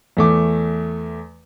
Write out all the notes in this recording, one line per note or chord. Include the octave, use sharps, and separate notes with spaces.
E2 A3 D6